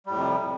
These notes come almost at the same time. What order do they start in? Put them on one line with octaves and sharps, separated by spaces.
G3 A2 F2 C3